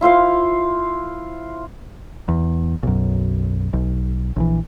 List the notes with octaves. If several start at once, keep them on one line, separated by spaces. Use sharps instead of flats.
E4 F4 C5 F5
E2
B1 F#2
B1
A#1 E3